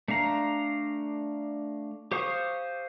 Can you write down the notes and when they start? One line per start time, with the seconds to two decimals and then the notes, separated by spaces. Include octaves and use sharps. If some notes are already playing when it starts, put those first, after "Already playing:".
0.08 A3 D4 F5 A#5
2.12 G4 C5 F5 C#6 D#6